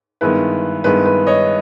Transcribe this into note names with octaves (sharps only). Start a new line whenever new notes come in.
G2 D#3 G#3 B3 E4 B4
G2 D#3 G#3 B3 E4 B4
B4
C#5 D#5